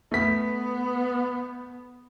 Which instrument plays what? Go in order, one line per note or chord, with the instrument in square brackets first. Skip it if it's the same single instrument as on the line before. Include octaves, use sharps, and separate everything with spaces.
[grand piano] A3 B6 [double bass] B3